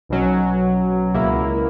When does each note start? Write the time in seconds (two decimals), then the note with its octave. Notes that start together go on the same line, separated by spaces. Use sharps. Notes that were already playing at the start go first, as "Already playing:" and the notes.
0.09 B1 B2 F#3 C#4
1.14 C#2 B2 A#3 E4